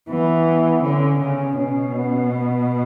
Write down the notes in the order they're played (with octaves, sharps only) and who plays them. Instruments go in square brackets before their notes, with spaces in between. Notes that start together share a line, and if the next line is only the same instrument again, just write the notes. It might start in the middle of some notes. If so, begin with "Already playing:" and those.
[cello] E3 [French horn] B3
[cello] D3 [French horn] C#4
[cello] C#3
[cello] B2 [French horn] C#4
[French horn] B3
B3